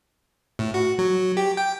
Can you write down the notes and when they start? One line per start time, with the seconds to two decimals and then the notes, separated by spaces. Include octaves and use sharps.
0.59 A2
0.74 F#4
0.99 F#3
1.37 G4
1.57 G5